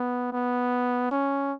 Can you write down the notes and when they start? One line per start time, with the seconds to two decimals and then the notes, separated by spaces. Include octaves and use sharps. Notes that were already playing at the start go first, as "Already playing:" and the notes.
Already playing: B3
0.32 B3
1.11 C#4